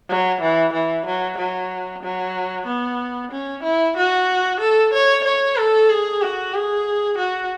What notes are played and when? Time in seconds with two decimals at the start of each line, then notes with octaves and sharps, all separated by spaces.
0.09 F#3
0.41 E3
0.73 E3
1.06 F#3
1.38 F#3
2.03 F#3
2.66 B3
3.31 C#4
3.63 E4
3.96 F#4
4.60 A4
4.93 C#5
5.24 C#5
5.57 A4
5.89 G#4
6.21 F#4
6.54 G#4
7.18 F#4